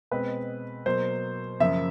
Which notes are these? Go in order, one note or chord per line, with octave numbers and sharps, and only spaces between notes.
B2 G#3 C4 B4
B2 F#3 A#3 C5
F#2 C#3 F3 A#3 E5